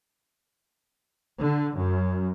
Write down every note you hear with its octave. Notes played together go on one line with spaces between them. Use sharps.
D3
F#2